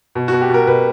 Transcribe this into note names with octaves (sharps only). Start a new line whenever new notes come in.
B2
B2 F#4
G4
B2 A#4
B2 B4